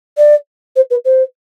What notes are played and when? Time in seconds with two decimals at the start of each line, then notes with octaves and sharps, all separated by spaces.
0.17 D5
0.76 C5
0.90 B4
1.05 C5